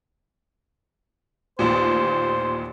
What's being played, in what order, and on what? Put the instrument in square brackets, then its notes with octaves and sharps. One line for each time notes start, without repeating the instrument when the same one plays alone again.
[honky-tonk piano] A1 D#2 A#2 [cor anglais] C5